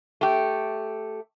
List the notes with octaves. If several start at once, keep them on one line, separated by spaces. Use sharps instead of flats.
A3 G4